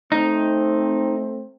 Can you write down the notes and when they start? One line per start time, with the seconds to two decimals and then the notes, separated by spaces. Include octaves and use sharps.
0.12 A3 C4 D#4